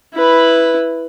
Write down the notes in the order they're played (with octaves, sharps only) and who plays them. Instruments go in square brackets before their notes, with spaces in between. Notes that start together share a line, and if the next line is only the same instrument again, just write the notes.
[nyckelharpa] E4 B4